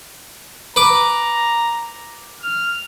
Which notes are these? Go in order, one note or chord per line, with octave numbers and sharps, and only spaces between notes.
B4 A#5 D6
F6